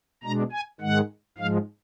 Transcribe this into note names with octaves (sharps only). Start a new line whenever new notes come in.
B2 G#3 D4 A#5
G#5
G#2 D#3 G#3 F#5
G#2 F3 G#3 F5